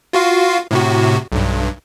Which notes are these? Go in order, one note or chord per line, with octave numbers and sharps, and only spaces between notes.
F4 F#4 F5
A2 C3 F#4
B1 G2